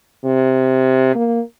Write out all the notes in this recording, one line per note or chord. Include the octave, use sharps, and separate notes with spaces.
C3
A#3